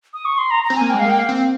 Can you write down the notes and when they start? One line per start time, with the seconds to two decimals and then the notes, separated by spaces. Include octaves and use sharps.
0.14 D#6
0.25 C#6
0.38 C6
0.51 A#5
0.64 A#5
0.70 C4
0.76 G#5
0.81 A#3
0.90 G#3 G5
0.99 F5
1.05 A#3 G5
1.19 F5
1.29 C4